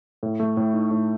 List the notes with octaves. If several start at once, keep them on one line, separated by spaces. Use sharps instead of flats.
A2
A3
A2
D#4
A2